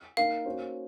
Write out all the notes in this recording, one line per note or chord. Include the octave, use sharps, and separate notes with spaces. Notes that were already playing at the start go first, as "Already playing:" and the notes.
A#3 D#4 A#4 F5
A#3 C#4 F#4 C5